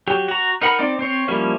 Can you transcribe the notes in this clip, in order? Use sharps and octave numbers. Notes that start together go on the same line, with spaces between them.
F#3 G4
F#4 A#5
D#4 A#4 F#5 B5
C4 D#4 D5
C4 C5 C#5
F3 G3 A#3 C#4 E4